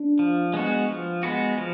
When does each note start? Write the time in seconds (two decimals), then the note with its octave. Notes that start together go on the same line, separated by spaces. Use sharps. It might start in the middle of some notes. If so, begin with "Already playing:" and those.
Already playing: D4
0.19 F3
0.54 G#3 B3 F#4
0.89 F3
1.23 G#3 B3 F#4
1.58 F3